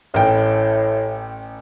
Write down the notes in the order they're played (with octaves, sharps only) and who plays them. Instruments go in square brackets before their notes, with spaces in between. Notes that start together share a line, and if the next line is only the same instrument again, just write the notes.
[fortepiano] A1 G5 [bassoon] A2